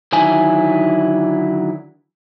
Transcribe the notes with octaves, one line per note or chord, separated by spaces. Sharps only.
D3 D#3 F#3 E4 G#5